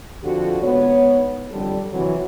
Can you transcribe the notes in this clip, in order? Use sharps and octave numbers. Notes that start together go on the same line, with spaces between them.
F2 D3 F3 F#4 G4
G#2 B3 C#5
F2 D3 G3 A4
C3 E3 F#3